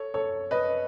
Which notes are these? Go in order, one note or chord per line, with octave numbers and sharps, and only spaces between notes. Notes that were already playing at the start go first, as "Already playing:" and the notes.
Already playing: A4 C#5
A4 C#5
B4 D#5